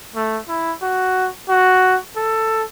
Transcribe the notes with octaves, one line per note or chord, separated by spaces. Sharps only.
A3
E4
F#4
F#4
A4